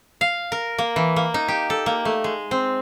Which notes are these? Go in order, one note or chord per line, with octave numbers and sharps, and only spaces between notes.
F5
A#4
A#3
E3
A#3
D#4
G4
A4
A#3
A3
G#3
C4